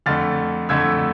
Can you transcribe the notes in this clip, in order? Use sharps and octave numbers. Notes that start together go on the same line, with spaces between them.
F2 D3 A3 F6 A6
F2 D3 A3 E6 G#6